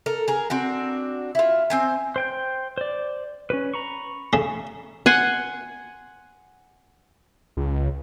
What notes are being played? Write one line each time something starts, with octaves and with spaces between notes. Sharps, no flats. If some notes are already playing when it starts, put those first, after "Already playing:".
A4 A#4
G#4 A#4
C4 D4 F#4
E4 F4
C4 C5 G#5
C5 G5 G6
C5 D5
C#4 G4 B4
A#5 B5 C#6
C#3 A3 G#4
F#5 G#5 C6
C#2